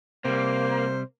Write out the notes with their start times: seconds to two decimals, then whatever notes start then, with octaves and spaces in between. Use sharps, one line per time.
0.25 C3 G3 A#3 C5